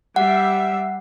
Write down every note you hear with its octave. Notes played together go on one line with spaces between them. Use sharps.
G3 E5 F#5